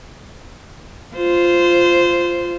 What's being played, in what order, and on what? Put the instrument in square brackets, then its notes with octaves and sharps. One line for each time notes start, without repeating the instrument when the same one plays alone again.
[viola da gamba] F4 C5